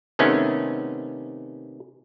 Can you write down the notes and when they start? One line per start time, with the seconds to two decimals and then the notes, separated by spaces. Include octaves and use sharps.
0.19 C3 D#3 A3 B3 C#4